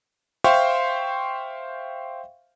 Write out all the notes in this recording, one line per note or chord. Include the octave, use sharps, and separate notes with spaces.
C5 E5 F5 G5 C6 C#6